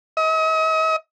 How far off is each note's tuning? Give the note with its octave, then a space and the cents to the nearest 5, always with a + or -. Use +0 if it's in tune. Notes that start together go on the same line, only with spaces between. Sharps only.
D#5 +40